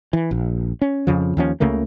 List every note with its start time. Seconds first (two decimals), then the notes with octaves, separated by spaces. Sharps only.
0.13 E3
0.31 A#1
0.81 C#4
1.07 F2 C#3 F3
1.37 D#2 F3 C#4
1.60 C#2 C#3 A3 A#3